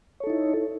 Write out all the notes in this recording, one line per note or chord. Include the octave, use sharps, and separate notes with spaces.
D#4 E4 A4 C#5